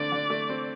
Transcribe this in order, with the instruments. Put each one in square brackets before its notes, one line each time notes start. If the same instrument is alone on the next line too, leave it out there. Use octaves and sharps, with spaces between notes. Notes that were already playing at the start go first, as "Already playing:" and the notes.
Already playing: [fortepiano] D3 A3 C4 [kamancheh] D5
[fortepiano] D3
A3
C4